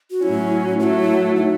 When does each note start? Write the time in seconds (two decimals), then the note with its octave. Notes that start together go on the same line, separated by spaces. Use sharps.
0.11 F#4
0.22 A2 F#3 C#4 E4
0.80 A2 F#3 A3 E4 F#4
1.36 D#4